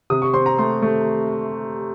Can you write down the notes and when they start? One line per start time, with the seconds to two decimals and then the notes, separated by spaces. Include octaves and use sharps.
0.10 C3 D#6
0.22 C#6
0.33 C4 C6
0.46 A#5
0.58 A3 C6
0.82 A3